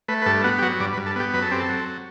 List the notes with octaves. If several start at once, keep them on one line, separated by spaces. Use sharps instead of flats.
A3 B4
B4
G2 A4
B3 F#4
G4
F#3 F#4
G2 D5
B4
G2
A4
B3 G4
F#2 B4
A4
C4 G4
A4
F#3